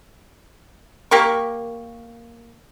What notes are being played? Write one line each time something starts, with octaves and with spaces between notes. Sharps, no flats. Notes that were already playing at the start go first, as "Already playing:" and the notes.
A#3 G4 A#4 C#6